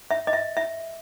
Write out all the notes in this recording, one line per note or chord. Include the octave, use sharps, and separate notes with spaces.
E5
D#5
E5
E5